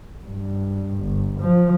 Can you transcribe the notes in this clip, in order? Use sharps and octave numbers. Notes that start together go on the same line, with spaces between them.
G2
G1
F3